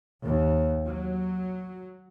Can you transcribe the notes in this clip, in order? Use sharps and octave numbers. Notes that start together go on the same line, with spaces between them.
D#2
F#3